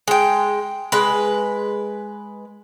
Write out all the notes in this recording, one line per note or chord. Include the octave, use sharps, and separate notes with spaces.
G#3 G5
G#3 B4